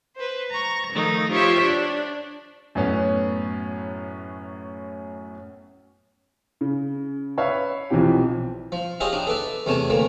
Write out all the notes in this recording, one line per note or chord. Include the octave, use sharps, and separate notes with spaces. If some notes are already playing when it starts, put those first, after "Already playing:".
B4 C5
A#5 C#6
D#3 F3 A3 D#4
F4 G4 C5 C#5 E5
D4
F#2 A2 B3 C#4
C#3
B4 C#5 E5 F5
B1 E3 F3 C4 G4
F3
E4 F4 G4 G#4 C#5 D#5
D4 D#4
A4 B4 D5 E5
E2 C3 A3 C#4 G#5 A5
D2 E3 A3 A#3